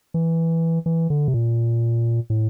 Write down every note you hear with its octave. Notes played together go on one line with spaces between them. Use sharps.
E3
E3
D3
C3
A#2
A2